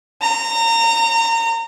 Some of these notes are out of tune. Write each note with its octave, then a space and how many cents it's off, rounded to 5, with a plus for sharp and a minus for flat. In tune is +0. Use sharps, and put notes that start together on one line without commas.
A#5 -30